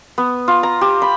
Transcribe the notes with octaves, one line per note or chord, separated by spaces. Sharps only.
B3
F4
A#5
G4
B5